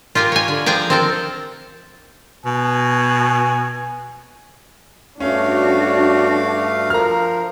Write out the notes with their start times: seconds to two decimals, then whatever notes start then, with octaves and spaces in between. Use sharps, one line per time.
0.15 F4 G4 A#4 G#5
0.32 C#5 G#5
0.48 D3
0.66 F3 G#4 F5 G5 A#5
0.90 C4 A4 A#4
2.45 B2 G#5
5.20 G2 A3 C#4 D4 F#4 F5
6.90 F3 A#4 F5 A#5 F6